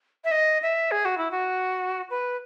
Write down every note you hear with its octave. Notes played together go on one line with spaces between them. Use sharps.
E5
D#5
E5
G#4
F#4
E4
F#4
B4